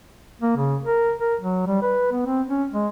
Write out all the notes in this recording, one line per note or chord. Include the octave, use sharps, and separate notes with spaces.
A#3
C#3
A#4
A#4
F#3
G3
B4
B3
C4
C#4
G#3